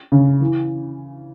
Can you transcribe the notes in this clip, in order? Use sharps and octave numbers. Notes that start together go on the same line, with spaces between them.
C#3
E3